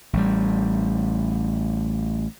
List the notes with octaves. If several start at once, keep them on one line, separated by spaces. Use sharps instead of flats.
A1 G3